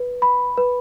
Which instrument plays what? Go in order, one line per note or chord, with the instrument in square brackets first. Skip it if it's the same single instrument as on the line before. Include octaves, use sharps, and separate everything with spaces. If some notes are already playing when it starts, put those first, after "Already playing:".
Already playing: [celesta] B4
B5
B4